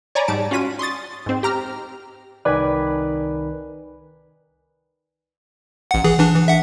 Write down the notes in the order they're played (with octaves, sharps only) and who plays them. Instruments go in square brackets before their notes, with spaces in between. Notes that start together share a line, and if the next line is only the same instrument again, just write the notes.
[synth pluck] C#5 D5 G#5 A#5 B5
G#2 G3 A5 D7
C#4 F4 F#4 B6 D#7
C6 C#6 D#6 A6
G#2 C4
G4 A#5 F6
[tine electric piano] C2 D#3 B4 [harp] D5 G#5 B5
[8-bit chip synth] A1 F#5
E3 G#4
E3 D4
E3
E5 F#5